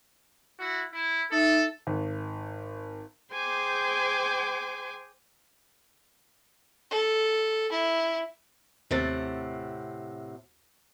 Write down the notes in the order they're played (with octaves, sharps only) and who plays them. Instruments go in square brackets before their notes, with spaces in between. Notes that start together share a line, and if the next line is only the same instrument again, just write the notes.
[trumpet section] E4 F#4
E4
[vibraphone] D#4 E5 [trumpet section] A4
[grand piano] G#1
[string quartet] G#4 C5 G5 G#5 C6 D6
[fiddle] A4
E4
[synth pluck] D#2 A6 [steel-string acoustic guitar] A2 C3 F#5